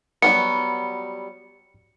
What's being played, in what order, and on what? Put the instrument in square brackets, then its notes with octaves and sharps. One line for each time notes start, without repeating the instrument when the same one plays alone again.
[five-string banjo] F#3 G3 B3 [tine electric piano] C#7